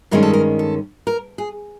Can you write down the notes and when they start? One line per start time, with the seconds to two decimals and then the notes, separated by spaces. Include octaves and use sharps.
0.11 G2 D#3 G#3 C#4 A#4
0.22 A4
0.33 A#4
0.59 A4
1.07 A#4
1.38 G#4